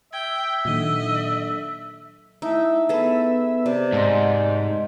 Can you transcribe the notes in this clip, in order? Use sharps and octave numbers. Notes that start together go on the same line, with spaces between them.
E5 G5 G#6
A#2 D#3 F#3 D4 A4 D#5
A3 D#4 E4 E5
B3 G#4 A4 B4
C3 D5
G#2 A3 D#5 C6